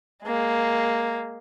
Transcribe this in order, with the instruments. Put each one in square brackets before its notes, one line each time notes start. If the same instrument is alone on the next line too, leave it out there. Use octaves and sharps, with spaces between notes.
[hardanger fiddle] G#3 A#3